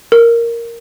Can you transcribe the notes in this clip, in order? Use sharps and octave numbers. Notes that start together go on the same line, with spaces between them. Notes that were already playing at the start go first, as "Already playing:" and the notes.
A#4